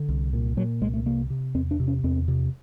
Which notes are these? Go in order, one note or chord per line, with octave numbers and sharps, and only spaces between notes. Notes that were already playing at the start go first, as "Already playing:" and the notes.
Already playing: D3
C2
A#2
A#2 F#3
C2 G#3
A3
C3 A#3
C3
E2 C4
D4
C3
C#4
E2 C4
C3